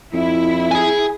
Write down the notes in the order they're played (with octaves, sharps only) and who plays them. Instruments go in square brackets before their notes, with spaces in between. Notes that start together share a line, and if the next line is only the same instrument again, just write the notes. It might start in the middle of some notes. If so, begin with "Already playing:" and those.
[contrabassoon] F2 [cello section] E4
[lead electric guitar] G#4 G#5